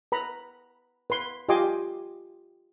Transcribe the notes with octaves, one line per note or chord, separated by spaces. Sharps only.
B4 A#5 B5
B4 C6
F4 G4 D#5 G#5 C6 D6